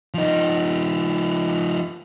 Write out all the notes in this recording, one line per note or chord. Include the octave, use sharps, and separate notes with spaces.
F3 D#4